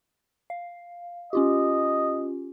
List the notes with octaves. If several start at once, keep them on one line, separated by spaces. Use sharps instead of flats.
F5
C#4 F4 G4 D#5